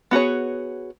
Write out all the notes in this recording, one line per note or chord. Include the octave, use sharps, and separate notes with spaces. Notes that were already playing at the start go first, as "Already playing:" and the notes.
B3 F#4 G#4 C#5